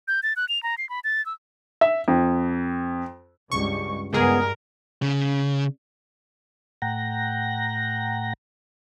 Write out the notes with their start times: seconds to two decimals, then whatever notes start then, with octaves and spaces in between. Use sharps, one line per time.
0.08 G6
0.23 A6
0.36 F#6
0.49 F7
0.63 A#5
0.78 C7
0.89 B5
1.04 A6
1.26 E6
1.81 E5
2.08 F2
3.52 C#2 G2 C#6
4.13 C#2 G2 B3 G#4 A#4
5.02 C#3
6.82 A2 F#5 G5 A#5 A#6